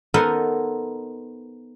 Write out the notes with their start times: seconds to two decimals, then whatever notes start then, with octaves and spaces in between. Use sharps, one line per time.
0.14 B3 D#4 A4 A#4 C5 F#5